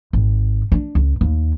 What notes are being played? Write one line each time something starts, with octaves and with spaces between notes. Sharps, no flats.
G#1
D4
C#2
D#2